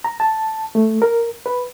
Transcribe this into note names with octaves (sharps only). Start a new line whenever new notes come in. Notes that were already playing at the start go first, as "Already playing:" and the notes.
A#5
A5
A3
A#4
B4